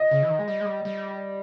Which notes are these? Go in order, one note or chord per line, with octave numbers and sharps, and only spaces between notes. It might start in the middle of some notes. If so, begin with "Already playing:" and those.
Already playing: D#5
C#3
E3
D#3
G#3
G3
G#3
G3
G3